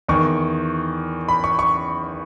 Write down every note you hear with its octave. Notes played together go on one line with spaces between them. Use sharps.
E2 D#3 C#6
B5
C#6
C#6